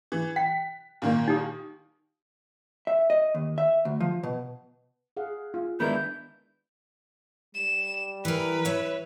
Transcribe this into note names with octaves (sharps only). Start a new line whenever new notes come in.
E3
G5 B6
A#2 D#3 A#3
D#4 G4 D#6
E5
D#5
D#2
E5
D2
F3
B2
G#4 F5 F#5
F4
D#3 G#3 B3 D4 E4 A#4 B5 G6
G3 E7
E3 A#4 B4
C#5 E5